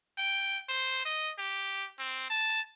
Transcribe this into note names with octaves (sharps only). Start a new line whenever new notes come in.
G5
C5
D#5
G4
C4
A5